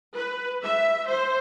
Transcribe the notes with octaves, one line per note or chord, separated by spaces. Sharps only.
B4
E5
C5